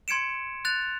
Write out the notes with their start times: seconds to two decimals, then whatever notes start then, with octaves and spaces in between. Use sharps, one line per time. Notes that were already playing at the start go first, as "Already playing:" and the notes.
0.08 C6 G#6 C#7 D7 E7
0.65 F#6 A6 F7